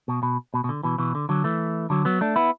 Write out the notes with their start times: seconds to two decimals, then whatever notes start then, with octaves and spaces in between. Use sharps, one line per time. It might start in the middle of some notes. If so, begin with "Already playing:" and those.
0.08 B2
0.23 B2
0.54 B2
0.64 B2
0.69 D3
0.83 B2 E3
0.98 B2 E3
1.15 D3
1.29 D3 F#3
1.44 E3 A3
1.90 D3 F#3
2.05 F#3 B3
2.21 A3 D4
2.36 B3 E4